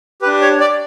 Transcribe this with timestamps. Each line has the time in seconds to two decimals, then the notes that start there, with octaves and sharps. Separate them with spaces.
0.22 G4 B4
0.27 D4
0.41 C#5
0.60 D5